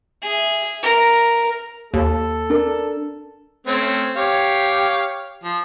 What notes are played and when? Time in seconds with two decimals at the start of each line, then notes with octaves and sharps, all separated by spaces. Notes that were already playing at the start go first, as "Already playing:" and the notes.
0.23 G#4 E5
0.83 A#4
1.94 D#2 A4
2.50 D4 A#4
3.67 A3 C4 C#4
4.16 G4 C#5 F5
5.44 F3